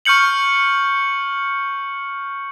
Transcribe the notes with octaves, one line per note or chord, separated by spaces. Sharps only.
C#6 F6 G6 C#7 F#7